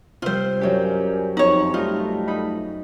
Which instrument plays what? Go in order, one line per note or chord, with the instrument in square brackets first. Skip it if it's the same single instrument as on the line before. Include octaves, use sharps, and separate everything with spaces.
[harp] C3 G3 [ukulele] F4 C5
[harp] F#2 G4 G6 [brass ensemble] C#4 A#4 D5
[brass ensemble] F2 [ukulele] D#4 C#5
[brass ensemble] G3 A3 [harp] D#4 A#4 [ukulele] F4
[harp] D#4 B5